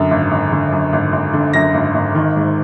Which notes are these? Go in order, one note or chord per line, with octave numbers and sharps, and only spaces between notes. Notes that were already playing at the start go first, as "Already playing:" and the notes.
Already playing: F#2 D3
G#1
G#1
D3
F#2
G#1
G#1
D3
F#2 A#6
G#1
G#1
D#3
G#2